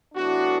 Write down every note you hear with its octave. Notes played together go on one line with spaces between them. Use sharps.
A2 E3 B3 D4 F#4